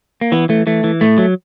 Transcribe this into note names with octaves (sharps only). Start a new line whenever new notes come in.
A#3
E3 B3
E3 A3
E3 A3
E3
A2 A3
F#3